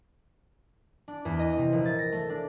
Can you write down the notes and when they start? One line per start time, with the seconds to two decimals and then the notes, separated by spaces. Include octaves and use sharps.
1.08 D4
1.25 E2
1.39 D#5
1.58 C3
1.73 A#1
1.85 A6
1.99 A#6
2.12 A3
2.30 D4